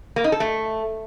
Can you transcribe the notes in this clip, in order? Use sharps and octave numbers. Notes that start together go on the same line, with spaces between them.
A#3
D#4
A4
A3